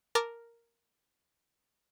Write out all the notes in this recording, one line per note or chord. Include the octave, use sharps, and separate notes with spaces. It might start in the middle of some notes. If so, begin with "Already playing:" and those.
A#4 A5 A#5 D6 F6